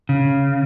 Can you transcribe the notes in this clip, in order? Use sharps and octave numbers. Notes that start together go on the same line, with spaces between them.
C#3